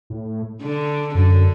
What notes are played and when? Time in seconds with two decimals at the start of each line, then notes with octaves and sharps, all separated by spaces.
0.10 A2
0.62 D3
1.15 F#2 D3